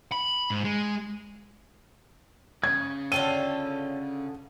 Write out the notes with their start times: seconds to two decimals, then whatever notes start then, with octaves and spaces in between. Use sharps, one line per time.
0.12 B5
0.50 G#2
0.64 G#3
2.64 C#3 G#6
3.12 D3 F4 A4 C#5 G5 D#7